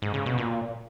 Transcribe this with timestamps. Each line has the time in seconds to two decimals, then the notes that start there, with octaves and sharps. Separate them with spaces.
0.02 G#2
0.14 C#3
0.26 B2
0.38 A#2